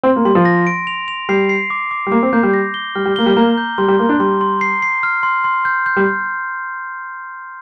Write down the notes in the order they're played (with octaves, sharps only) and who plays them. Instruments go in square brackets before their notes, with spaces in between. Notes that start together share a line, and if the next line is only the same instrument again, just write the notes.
[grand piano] C4 [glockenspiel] C6
[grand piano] A#3
[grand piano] G3 [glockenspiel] C6
[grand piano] F3
[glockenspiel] A#6
D7
F7
F7
[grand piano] G3 [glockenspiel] C7
[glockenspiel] C7
D6
D6
[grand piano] G3
[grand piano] A#3 [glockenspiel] D6
[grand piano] C4
[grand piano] A#3 [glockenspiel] G6
[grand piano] G3
[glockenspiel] A#6
G7
[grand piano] G3 [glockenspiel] F6
[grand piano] G3
[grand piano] A#3 [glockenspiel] G7
[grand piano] G3
[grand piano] A#3 [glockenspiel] A#5
[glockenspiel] G6
[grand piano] G3 [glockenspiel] C6
[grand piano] G3
[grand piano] A#3 [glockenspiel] C6
[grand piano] D4
[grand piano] G3 [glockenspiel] C6
[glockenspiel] C6
C7
C7
F6
C6
C6
G6
G6
[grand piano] G3